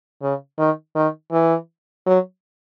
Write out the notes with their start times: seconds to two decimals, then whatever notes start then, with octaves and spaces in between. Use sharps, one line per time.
0.22 C#3
0.58 D#3
0.95 D#3
1.31 E3
2.06 F#3